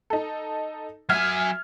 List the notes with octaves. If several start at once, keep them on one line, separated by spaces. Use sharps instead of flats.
D#4 A4
F#3 E5 G#5 F6 G#6